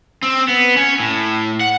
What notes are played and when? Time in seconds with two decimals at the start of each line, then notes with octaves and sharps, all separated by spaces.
0.23 C4
0.48 B3
0.77 C#4
1.00 A2
1.61 F#5